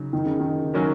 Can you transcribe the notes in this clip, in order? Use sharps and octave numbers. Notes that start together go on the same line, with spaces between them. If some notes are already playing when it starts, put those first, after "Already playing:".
Already playing: C#3 F#3 D#4
D#3
C#3
D#3
D#3 F#3 C#4 F#4 A#4